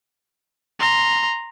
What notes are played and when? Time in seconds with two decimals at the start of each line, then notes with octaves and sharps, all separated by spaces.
0.80 A#5 C6